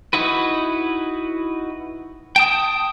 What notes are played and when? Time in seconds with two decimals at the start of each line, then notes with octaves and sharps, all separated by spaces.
0.13 D#4 E4 F#4 B4
2.36 G5 A5 D#6